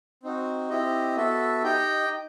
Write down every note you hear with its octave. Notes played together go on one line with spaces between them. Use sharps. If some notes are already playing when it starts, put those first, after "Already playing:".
C4 D#4 F#4
C4 E4 G4 D#5
B3 F#4 A4 E5
D#4 G4 D#5 G5